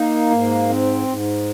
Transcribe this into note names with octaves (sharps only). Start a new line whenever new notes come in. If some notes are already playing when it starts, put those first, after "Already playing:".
Already playing: A#3 D#4
G#2
C4
G#2